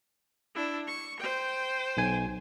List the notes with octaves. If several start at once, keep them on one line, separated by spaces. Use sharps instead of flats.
D4 E4
C#6
C5 G5
B1 G#5